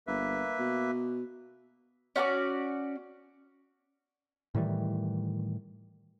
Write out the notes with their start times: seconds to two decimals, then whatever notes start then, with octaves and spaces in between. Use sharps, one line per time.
0.07 G1 A#3 B4 E5
0.59 B2
2.16 C#4 F#4 A4 D5
4.55 A2 D#3 E3 G3